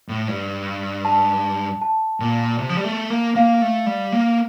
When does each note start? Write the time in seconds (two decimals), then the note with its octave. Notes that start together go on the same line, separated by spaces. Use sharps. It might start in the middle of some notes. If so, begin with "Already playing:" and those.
0.09 A2
0.28 G2
1.05 A5
1.82 A5
2.20 A#2
2.59 C3
2.69 F3
2.77 G3
2.84 A3
3.10 A#3
3.36 A#3 F5
3.62 A3
3.86 G3
4.12 A#3